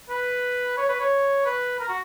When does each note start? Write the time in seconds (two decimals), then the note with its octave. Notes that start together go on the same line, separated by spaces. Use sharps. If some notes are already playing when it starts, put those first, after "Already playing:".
0.09 B4
0.77 C#5
0.89 B4
1.00 C#5
1.46 B4
1.80 A#4
1.89 F#4